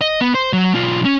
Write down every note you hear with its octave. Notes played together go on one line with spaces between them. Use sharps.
D#5
B3
C5
F#3
B1 F4
C#4